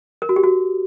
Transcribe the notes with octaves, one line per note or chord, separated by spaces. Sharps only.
A#4
F#4
G4
F#4